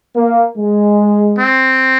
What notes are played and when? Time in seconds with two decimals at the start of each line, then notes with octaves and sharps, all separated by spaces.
0.16 A#3
0.56 G#3
1.38 C4